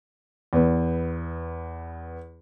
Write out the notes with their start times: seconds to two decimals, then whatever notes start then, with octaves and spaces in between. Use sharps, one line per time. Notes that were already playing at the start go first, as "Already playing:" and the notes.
0.53 E2 B3